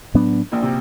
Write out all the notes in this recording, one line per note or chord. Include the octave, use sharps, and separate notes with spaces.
A2 F#3 B3 D4
A#1 A#2
C3